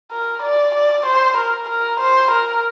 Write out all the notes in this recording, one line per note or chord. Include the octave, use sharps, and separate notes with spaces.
A#4
D5
D5
C5
A#4
A#4
C5
A#4